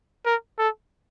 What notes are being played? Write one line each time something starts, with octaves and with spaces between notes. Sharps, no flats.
A#4
A4